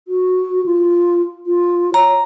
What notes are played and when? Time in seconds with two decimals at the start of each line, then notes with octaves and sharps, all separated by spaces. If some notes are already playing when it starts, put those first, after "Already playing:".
0.08 F#4
0.66 F4
1.46 F4
1.94 C#5 A#5